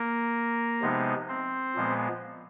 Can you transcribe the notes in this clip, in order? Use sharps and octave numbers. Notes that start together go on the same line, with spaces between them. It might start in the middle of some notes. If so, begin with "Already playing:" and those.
Already playing: A#3 A#4
C3 F3 G#3 B3 D#4
C4 C5
A#2 F3 G#3 B3